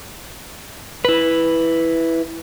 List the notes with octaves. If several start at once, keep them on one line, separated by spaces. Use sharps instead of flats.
E4 B4